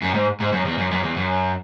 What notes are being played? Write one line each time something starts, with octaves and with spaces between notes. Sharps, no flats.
F#2
G#2
G#2
F#2
E2
F#2
F#2
E2
F#2